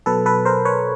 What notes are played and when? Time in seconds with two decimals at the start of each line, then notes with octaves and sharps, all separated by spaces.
0.06 B2 F#3 A4 B4
0.26 A4 B4
0.45 A#4 C5
0.65 B4 C#5